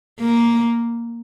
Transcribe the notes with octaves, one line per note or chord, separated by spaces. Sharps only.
A#3